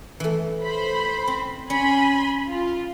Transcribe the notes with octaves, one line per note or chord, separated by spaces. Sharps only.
E3 A3
C5 B5
C4
C#4 G#5 B5 C6
F4